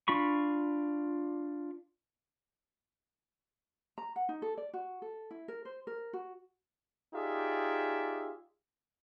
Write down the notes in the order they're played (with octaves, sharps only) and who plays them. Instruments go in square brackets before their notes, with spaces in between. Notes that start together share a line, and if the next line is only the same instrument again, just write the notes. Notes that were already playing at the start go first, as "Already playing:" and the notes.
[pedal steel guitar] D4 F4 B5 C#6
[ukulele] A#5
F#5
D#4
A4
D5
F#4
A4
E4
A#4
C5
A#4
F#4
[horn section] D#4 F4 G4 G#4 D5 E5